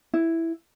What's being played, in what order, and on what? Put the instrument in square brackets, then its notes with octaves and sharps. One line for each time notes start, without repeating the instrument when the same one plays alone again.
[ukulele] E4